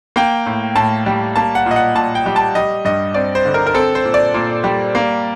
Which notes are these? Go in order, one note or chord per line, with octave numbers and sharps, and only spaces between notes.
A#3 G5
A2
A2 A5
G3
A#3 A5
F#5
A#2 D#5
F#5
A#2 A5
G5
G3
A5
G3 D#5
G2 D#5
C4 D5
C5
D3
A#4
A#4
C4 A4
C5
A#2
D5
A#2
G3
A#3